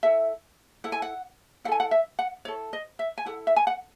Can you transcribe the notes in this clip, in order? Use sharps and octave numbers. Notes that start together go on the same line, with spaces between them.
E4 A4 E5
E4 A4 F#5
G#5
F#5
E4 A4 F#5 G#5
F#5
E5
F#5
E4 A4 C#5
D#5
E5
G#5
E4 A4 F#5
E5
G#5
F#5